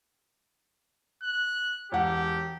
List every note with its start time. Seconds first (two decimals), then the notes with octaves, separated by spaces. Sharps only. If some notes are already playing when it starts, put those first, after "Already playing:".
1.23 F#6
1.92 E1 G4 F#5